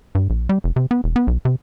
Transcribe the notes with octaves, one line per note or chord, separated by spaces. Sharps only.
G2
A#1
G3
F1
C3
B3
E1
B3
B1
C3